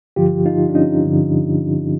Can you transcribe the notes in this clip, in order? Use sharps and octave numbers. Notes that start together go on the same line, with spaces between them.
G2 D3 F3 F4 G4
D#4 F4
D4
C#4 D#4
G2 D3 F3